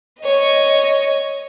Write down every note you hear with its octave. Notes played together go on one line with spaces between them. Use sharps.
C#5 D#5